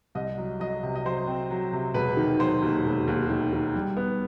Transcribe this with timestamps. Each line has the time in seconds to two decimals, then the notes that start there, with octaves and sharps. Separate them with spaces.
0.15 C2 D#5
0.38 F#3
0.60 F#3 D#5
0.83 C3
0.96 D#5
1.05 F#3 C5
1.27 C4
1.51 F#3
1.73 C3
1.94 E1 B4
2.17 D#3
2.39 F#3 C5
2.62 D#2
2.85 E1
3.08 D#2
3.30 D#3
3.53 D#3
3.75 G3
3.97 B3